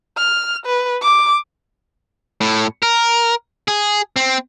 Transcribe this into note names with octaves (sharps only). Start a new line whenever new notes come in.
F6
B4
D6
A2
A#4
G#4
C4